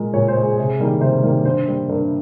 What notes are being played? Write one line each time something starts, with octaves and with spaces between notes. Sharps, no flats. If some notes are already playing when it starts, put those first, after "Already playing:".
Already playing: A#2 G#3 A#4
A#2 C#5
C5
G#3
G#4
C3 G#4
D#3 G3 A#3
C3 C5
D#3 G3 A#3
G2 C5
G3 A#3
G2 A#4